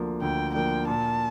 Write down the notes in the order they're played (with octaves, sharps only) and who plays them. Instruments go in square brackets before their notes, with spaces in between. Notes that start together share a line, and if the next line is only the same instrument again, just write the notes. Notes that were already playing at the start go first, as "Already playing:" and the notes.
Already playing: [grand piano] D2 D3 F3 A#3
[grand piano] D2 [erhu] G5
[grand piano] D3 F3 A#3 [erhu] G5
[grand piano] A#2 [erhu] A5